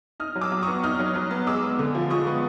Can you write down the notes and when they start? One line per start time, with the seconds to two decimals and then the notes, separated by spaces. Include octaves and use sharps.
0.20 D#4 D#6 F6
0.36 F#3
0.41 D6 E6
0.52 F#3
0.63 B3 C#6 D#6
0.83 D#4 D#6 F6
0.99 F#3
1.15 F#3
1.31 B3
1.47 G#3 D6 E6
1.63 B3
1.79 D3
1.95 F3
2.10 G#3 C#6 D#6
2.27 B3